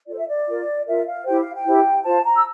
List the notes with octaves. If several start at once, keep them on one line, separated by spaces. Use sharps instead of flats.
F4 A4 C5 D5
E5
D5
F4 A#4
F4 A#4 E5
F5
E4 G4 C5 G5
F5
G5
E4 G4 C5
F4 C5 A5
A#5
E6